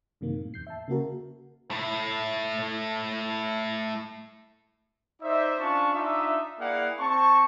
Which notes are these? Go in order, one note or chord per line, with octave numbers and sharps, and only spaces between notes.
F#2 C3 D#3 A#3
A2
E2 G6 C7
E5 A5
C#3 A#3 F#4 A#4
A3 E4
D#4 C5 D5 E5
C#4 D4 F4 A5 C#6
D4 D#4 F4 E5
A#3 E4 G#4 D5 F5 F#5
C4 A5 C#6